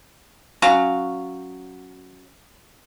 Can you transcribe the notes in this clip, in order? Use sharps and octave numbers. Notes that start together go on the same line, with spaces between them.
F#3 C#4 F5